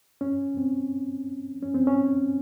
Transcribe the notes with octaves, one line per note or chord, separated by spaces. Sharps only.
C#4
C4
C#4
C4
C#4